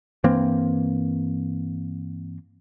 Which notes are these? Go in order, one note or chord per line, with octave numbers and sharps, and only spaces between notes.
G2 E3 A#3 C4